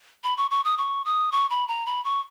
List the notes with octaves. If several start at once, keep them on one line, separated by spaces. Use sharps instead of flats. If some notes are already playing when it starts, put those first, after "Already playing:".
B5
C#6
C#6
D#6
C#6
D#6
C#6
B5
A#5
B5
C#6